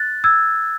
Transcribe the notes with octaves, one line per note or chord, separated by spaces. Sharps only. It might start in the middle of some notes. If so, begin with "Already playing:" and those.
Already playing: F#6 A6
E6 G#6